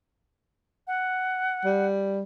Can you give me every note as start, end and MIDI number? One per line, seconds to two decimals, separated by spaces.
0.87 1.86 78
1.65 2.22 55